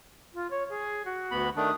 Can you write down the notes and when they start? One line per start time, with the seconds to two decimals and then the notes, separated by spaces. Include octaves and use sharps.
0.34 F4
0.50 C#5
0.69 G#4
1.05 F#4
1.31 D2 B3 B5
1.56 D#3 A3 D4 D#6